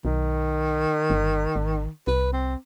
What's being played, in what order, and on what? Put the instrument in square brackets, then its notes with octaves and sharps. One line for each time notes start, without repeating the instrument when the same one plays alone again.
[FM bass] B1 [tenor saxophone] D#3
[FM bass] G1
G#1
[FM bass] C2 [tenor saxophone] B4
[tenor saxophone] C4